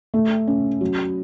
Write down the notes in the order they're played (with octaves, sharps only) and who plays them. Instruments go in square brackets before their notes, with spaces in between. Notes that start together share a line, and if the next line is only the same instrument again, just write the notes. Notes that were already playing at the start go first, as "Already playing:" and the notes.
[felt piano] A3
C#4
F#3